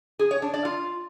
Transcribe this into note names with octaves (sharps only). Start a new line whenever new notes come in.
G#4
C#5
D4
D5
F4